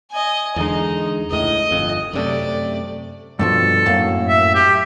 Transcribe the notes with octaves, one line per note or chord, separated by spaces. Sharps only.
D#5 G#5
E2 D3 G#3 D#4
C#2 A2 D#5
G1 F2
F#2 C3 A3 D5
G2 B2 F3 A4
F#2 A2 A#3
E5
G4